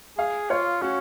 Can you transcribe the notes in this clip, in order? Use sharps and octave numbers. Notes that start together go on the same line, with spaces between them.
G#4 F5
F4 C#5
C#4 F#4